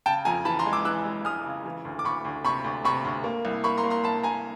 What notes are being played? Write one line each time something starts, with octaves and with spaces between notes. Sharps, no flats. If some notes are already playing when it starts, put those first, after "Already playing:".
C#3 G5 A5
F2 G#5 A#5
E3 A5 B5
A#5 C6
G#3
D6 E6
E3 E6 F#6
G#3
G#3 D#6 F6
C#3
E3
D2
D6
D2 B5 C#6
D2
C3 B5 C#6
D2
C3 B5 C#6
D2
A#3
C2
A#3 B5 C#6
A#5 C6
A#3
A#5 C6
C2 A5 B5
A#3 G#5 A#5